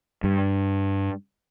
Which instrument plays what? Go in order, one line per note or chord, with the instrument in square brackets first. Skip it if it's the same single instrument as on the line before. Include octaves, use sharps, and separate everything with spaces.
[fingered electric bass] G2